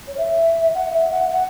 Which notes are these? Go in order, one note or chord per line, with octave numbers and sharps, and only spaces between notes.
C#5
E5
F#5
E5
F#5
F#5